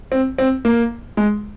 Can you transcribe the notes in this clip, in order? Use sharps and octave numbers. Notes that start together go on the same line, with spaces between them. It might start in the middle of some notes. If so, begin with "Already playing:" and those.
C4
C4
A#3
G#3